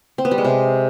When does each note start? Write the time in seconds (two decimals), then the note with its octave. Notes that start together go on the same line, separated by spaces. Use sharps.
0.18 C4
0.25 B3
0.31 G3
0.38 G#3
0.45 C3